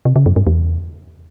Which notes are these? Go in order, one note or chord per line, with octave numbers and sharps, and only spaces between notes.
C3
C#3
F#2
G2
E2